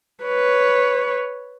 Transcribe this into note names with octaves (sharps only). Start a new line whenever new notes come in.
B4 C#5